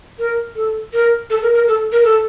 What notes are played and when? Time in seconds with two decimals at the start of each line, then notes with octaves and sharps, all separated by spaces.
0.19 A#4
0.56 A4
0.93 A#4
1.30 A4
1.42 A#4
1.54 A#4
1.68 A4
1.92 A#4
2.04 A4